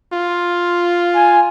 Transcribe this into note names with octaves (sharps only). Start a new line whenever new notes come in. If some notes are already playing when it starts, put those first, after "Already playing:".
F4
G#5